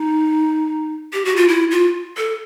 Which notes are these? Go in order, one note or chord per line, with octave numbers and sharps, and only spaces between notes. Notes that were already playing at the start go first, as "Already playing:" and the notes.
Already playing: D#4
G4
F#4
F4
E4
F4
A4